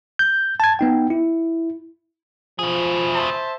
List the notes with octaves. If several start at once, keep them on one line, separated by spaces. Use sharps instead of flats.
G6
A5 G#6
B3 D#4 G5
E4
B2 F3 G#4
C5 E5 A5